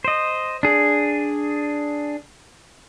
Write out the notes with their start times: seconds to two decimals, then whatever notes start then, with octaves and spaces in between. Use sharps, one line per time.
0.04 C5 D#5
0.63 D4 G#4